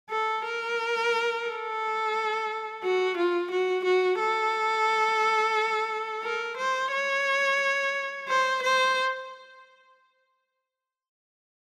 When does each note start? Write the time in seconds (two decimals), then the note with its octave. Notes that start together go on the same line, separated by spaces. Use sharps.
0.10 A4
0.44 A#4
1.46 A4
2.83 F#4
3.17 F4
3.51 F#4
3.84 F#4
4.19 A4
6.23 A#4
6.58 C5
6.92 C#5
8.28 C5
8.62 C5